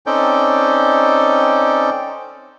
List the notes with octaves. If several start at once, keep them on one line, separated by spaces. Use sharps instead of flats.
C4 C#4 D#4 A4 D5 G5